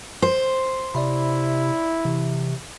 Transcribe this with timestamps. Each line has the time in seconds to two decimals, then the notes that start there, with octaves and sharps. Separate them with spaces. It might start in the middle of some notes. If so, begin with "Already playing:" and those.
0.22 C5
0.95 C3 E4 D5 E5 B5
2.05 C3 E3